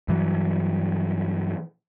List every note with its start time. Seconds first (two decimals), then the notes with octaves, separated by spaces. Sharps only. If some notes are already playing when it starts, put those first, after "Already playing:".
0.08 G2 E3 F#3